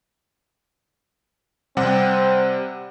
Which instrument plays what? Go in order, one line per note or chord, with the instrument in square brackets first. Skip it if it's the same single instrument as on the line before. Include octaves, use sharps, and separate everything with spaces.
[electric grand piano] C3 G3 F#5 [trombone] C4